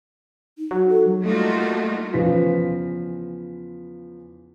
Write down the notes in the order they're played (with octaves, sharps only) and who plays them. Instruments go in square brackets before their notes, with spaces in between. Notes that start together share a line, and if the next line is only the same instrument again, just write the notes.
[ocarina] D#4
[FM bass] F#3
[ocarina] A4
[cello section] G3 A3 A#3 D#4 F4 F#4
[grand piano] E2 C#3 F3 B4 B6